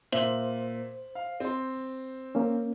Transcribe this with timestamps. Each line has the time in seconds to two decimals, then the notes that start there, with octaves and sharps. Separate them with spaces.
0.12 A#2 C5 E5 F#7
1.15 F5
1.40 C4 C6
2.35 A#3 C#4